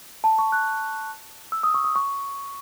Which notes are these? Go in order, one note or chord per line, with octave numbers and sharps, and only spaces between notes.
A5
C#6
F#6
E6
D#6
C#6
D#6
C#6